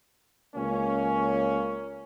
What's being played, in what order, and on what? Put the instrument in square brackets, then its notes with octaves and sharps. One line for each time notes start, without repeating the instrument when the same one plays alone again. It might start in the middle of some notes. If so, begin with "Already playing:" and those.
[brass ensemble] C#2 A#3 C#4